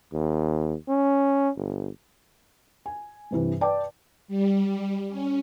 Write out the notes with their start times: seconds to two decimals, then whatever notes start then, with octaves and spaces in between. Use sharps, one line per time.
0.12 D#2
0.89 C#4
1.57 G1
2.86 G#5
3.31 G2 C3 E3
3.61 B4 D5 G5 A5 D6
4.28 G3
5.09 C#4